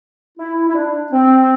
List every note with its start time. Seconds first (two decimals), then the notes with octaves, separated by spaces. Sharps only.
0.38 E4
0.69 E4
0.74 D4
1.11 C4